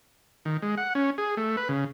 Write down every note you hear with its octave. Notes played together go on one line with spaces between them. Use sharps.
D#3
G#3
F#5
C#4
G#4
A3
B4
C#3